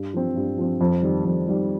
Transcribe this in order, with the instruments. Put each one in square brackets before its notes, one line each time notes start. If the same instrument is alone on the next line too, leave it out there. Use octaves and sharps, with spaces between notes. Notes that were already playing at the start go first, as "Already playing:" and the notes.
Already playing: [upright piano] G2
F3 C4
G2
F3 C4
F2
D#3 G3
F2
D#3 G3